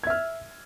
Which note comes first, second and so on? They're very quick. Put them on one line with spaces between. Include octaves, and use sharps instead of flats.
G#6 E5 F6